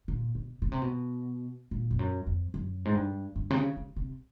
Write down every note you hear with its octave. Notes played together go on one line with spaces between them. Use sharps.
A#2
B2
B2
C3
B2
A#2
F2
F#2
F2
F#2
G#2
G2
G2
C3
C#3
C#3
C3